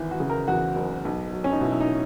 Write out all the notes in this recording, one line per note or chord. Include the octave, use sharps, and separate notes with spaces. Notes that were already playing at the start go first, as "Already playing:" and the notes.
Already playing: G#1 E3
F#4
C#3
A#4
E2 F#4
F#1
B1
F#3
C#4
D#4
B2 E4
E4
D#4